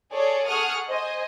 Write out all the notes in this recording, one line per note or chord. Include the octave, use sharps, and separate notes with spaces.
G#4 A4 C#5 D5
G#4 A4 F#5 C#6 D#6 F6
C5 D#5 G#5